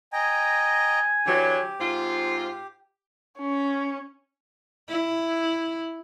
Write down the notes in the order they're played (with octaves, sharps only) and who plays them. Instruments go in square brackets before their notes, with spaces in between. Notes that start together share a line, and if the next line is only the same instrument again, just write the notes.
[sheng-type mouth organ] D#5 G5 A#5 [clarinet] G#5
[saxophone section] D3 E3 F#3 [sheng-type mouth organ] G4
[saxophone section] G#2 C4 F4
[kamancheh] C#4
[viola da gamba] E4